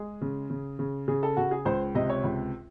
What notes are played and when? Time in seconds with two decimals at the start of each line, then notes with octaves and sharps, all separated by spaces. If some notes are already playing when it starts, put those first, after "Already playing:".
Already playing: G#3 G#4
0.21 C#3
0.50 C#3
0.79 C#3
1.08 C#3 G#4
1.23 A4
1.37 C#3 F#4
1.51 G#4
1.65 C#2 C5
1.95 C3 D#5
2.09 C#5
2.24 C#2